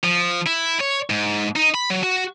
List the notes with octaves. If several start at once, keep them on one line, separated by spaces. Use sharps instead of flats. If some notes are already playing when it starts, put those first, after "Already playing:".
F3
E4
C#5
G#2
D#4
B5
F#3
F#4